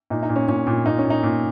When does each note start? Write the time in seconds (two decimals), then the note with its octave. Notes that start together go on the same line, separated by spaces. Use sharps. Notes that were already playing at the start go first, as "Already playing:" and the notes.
0.10 A#2 D#4
0.23 D#4
0.29 A#2
0.36 C#4
0.48 A#2 C#4
0.67 A#2
0.86 A#2 D#4
0.98 C#4
1.05 A#2
1.10 D#4
1.23 A#2